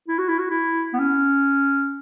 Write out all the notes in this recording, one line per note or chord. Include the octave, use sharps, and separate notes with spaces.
E4
F#4
E4
F#4
E4
B3
C#4